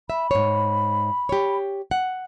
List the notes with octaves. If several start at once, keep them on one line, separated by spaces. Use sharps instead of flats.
E5 B5
G#2 C#5
G4 C#5
F#5